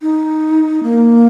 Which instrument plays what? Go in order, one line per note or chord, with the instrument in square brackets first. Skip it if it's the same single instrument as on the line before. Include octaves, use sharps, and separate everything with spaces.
[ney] D#4
A#3